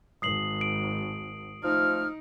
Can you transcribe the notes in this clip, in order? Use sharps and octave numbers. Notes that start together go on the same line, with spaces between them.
G#1 D#6 C7 F#7
D7
F3 A3 D#4 F6